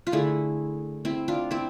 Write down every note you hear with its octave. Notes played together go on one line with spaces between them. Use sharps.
F4
D3 A3 E4 G#4
C4 E4
D4 F4
C4 E4